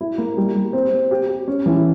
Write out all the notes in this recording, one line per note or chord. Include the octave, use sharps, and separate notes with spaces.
E4
A#3
G3
G3
C4
C4
G4
G4
C#4
E3